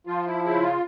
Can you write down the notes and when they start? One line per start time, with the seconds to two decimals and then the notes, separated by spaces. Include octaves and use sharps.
0.07 F3 F4
0.26 E4
0.44 C#3 E4
0.63 F4